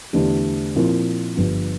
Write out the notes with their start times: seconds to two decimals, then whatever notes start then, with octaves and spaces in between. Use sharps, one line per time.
0.13 E2 D3 A3 D4 G4
0.76 A#2 F3 C4 E4 A#4
1.37 G1 G2 F3